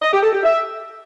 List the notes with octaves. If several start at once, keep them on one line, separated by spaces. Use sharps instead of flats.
D#5
G4
A4
G4
E5